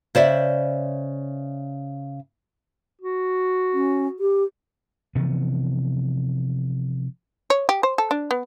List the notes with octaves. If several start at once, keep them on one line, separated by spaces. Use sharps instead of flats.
C#3 C5 D5 E5
F#4
C#4
G4
C3 E3 F3 B3
C#5
G4
C5
A4
D4
B3